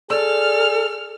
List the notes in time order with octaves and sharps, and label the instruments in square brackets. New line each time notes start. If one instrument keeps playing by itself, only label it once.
[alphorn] G#4 [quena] A4 [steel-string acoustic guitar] D5 [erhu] F6